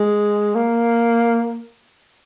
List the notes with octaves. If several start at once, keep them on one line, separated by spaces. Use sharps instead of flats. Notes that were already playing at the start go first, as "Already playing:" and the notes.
Already playing: G#3
A#3